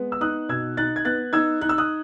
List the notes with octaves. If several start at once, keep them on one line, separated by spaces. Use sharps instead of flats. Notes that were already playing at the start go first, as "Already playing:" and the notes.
Already playing: G#3 B3
E6
D#4 D#6 F#6
B2 E6 G#6
D#4 F#6 A6
G#6
B3 F#6 A6
D#4 E6 G#6
D#4 F#6
E6
D#6 F#6